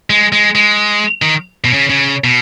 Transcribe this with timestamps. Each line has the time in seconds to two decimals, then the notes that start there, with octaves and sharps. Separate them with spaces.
0.10 G#3
0.32 G#3
0.55 G#3
1.22 D#3
1.65 B2
1.73 C#3
1.90 C#3
2.24 B2